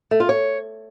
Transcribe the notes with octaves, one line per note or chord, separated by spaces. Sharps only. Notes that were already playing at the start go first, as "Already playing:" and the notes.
A3
F4
C#5